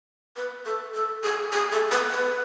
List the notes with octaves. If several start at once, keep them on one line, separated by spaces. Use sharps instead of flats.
B4
A4
A4
G#4
G#4
A4
B4
B4